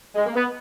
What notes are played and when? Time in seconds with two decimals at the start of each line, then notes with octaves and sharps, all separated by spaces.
0.15 G#3
0.26 A#3
0.35 B3